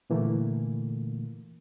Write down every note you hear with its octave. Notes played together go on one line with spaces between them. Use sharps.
A#2 D3 E3 A3 A#3